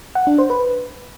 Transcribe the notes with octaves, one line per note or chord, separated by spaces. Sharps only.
F#5
D4
C5
B4